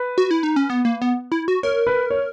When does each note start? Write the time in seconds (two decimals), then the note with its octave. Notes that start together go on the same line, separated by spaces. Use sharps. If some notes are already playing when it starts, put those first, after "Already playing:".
Already playing: B4
0.18 F#4
0.31 E4
0.43 D#4
0.56 C#4
0.70 B3
0.85 A#3
1.02 B3
1.32 E4
1.48 F#4
1.63 A#4 C#5
1.87 B4
2.10 C#5